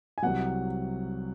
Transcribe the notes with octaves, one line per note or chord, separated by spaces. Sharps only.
G#5
C2 C3 F#3 F#5